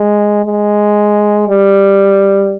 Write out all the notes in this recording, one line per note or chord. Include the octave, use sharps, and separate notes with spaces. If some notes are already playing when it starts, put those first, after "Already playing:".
Already playing: G#3
G#3
G3